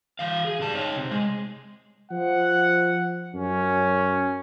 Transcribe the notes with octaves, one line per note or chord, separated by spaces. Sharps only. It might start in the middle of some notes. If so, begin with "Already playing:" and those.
E3 F5
G#4
G3 A5
D#4 C#5
C3
G#3
F3 F#5
F#2 C#4